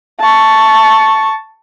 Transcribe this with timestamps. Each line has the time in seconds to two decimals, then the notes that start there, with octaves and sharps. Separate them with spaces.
0.20 A5 C#6